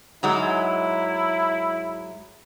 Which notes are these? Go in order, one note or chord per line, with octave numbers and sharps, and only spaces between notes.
G#2 F#3 G#3 E4